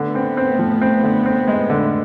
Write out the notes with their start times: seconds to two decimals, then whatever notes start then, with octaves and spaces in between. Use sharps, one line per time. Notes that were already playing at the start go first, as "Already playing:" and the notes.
Already playing: D3 A3 B3
0.15 C4
0.37 C4
0.59 F3
0.81 C4
1.03 D3
1.26 C4
1.48 G#3
1.70 D3